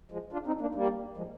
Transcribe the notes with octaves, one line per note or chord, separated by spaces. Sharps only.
F3 G#3
D4 F4
C4 D#4
A#3 D4
G3 A#3
F3 G#3